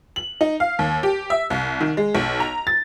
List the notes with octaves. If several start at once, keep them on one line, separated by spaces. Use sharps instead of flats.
F#7
D#4
F5
D#2
G4
E5
C2
D#3
G#3
B1
A#5
A6